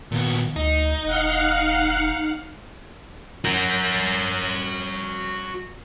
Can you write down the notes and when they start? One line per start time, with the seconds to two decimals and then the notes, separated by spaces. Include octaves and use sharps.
0.12 A#2 D#3 B3
0.56 D2 D#4
1.05 E1 F5 F#5
3.44 F#4 A#4